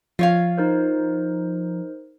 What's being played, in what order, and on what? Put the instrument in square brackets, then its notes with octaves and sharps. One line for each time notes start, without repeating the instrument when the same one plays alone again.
[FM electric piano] F3 [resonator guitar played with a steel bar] F4 C#5 F5
[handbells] D#4 A#4 C5